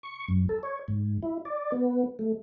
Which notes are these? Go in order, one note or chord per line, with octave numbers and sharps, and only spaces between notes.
C#6
F#2
A4
C#5
G#2
E4
D5
B3
A3